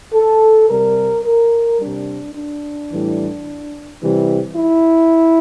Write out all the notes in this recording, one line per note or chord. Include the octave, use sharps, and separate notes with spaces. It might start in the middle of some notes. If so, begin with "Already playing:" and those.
A4
C3 G3 A#4
A#4
C3 G3 D4
D4
A2 E3 G3
C3 E3 G3
E4